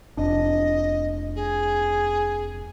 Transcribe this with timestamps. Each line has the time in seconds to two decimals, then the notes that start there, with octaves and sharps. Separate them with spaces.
0.17 F1 D4 D#5
1.35 G#4